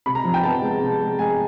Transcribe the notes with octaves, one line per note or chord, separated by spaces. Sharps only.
C3 B5
A#5
F3
G5
B3 A5
G#3
C3
G#3
G#3 G#5